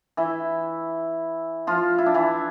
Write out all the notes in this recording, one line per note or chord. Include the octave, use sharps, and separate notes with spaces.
E3 E4
F3 F4
E4
D4
E3 E4